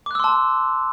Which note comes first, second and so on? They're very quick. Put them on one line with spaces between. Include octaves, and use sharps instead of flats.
D6 F#6 E6 C6 A5